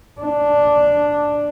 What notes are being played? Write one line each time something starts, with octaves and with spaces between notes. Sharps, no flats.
D4